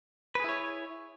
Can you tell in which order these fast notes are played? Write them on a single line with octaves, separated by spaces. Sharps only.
B4 G#4 E4 C#5